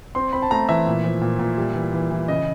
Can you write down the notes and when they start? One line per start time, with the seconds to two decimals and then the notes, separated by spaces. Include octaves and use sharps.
0.15 C4 C6
0.33 C4 B5
0.42 A5
0.51 A3 A#5
0.69 E3 E5
0.87 A#2
1.05 F3
1.21 A#2
1.39 A#2
1.58 G3
1.75 E3
1.94 E3
2.11 E3
2.28 C#3 D#5